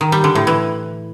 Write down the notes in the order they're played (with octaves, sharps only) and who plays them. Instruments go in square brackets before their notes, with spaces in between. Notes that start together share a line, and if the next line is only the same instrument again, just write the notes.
[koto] D#3
G3
D3
A2
E3